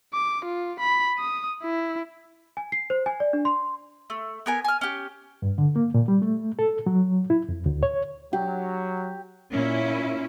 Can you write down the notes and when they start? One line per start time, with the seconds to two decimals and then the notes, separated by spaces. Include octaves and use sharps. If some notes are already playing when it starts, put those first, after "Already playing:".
0.14 D6
0.45 F4
0.80 B5
1.19 D#6
1.63 E4
2.57 G#5
2.72 C7
2.90 C5
3.06 G#5
3.20 D5
3.33 D4
3.45 C6
4.10 A3
4.46 B3 A#4 G#5
4.64 G#5 F6
4.81 C#4 G4
5.42 G2
5.58 D3
5.76 A#3
5.94 A#2
6.08 G3
6.22 A3
6.59 A4
6.86 F#3
7.30 E4
7.49 F2
7.66 D2
7.83 C#5
8.33 F#3 G4
9.52 A#2 C#4 E4